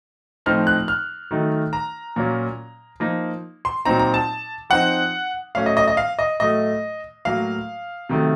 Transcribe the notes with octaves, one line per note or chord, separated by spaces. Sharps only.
A2 F3 C4 D#4 F6
F#6
F6
D#3 F#3 A3 D#4
A#5
A#2 F#3 A#3 C#4
F3 A#3 D#4
C6
A#2 F#3 C4 D#4 A#5
A#5
A5
F3 C4 D#4 F#5
A2 F#3 A3 C#4 F5
D#5
D#5
D#5
F5
D#5
A2 F#3 A3 D#5
A2 F#3 A#3 F5
C3 D#3 F#3 A3